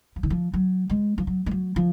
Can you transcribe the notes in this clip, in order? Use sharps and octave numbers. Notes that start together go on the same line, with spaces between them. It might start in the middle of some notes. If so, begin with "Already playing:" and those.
F3
D#3
F3
F#3
G#3
F3
F#3
G#3
F#3
F3